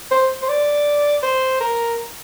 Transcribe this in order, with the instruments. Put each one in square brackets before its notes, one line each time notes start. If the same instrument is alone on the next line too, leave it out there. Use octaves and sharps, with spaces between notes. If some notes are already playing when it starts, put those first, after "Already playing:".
[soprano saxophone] C5
C5
D5
C5
A#4